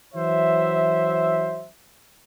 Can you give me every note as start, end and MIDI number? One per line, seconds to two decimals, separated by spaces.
0.15 1.68 52
0.15 1.68 54
0.15 1.68 72
0.15 1.68 76